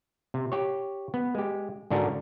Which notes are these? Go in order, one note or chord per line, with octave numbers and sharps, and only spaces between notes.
C3
G4 C#5
B3
G#3 G4
G#2 D3 D4 F#4 A#4